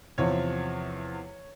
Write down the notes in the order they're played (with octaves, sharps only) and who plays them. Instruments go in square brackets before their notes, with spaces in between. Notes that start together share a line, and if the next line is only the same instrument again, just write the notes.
[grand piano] E2 C3 F3 C#5